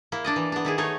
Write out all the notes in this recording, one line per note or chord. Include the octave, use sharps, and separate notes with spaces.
A#3 E4
D4 D5 D#5
E3
B3 D4
D#3 E4 G#4
A3 D#4 C#5